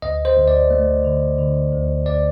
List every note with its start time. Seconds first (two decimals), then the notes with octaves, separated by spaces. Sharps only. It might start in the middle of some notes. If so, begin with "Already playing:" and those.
0.02 D2 D#5
0.25 C5
0.37 D2
0.48 D5
0.70 A3
1.04 D3
1.38 D3
1.73 D2
2.06 D2 D5